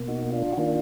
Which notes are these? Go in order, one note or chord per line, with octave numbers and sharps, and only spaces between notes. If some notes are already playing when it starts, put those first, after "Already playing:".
Already playing: B2 A#3
D#4 F#4
D4 F4
F#4
D#3 A#3 D4 F4